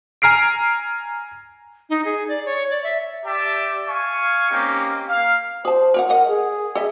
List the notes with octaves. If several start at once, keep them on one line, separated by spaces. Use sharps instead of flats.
G#5 A#5 F6 C7 D7
D#4
G#4
D5
C#5
D5
E5
G4 D5 E5 G5 A5
F5 G#5 C#6
A#3 C4 C#4 D#4 G4
A#3 F5
G#4 C5 A5
A#4 C#5 F#5
A#4 C#5 D#5 F#5
G#4
A4 D#5 E5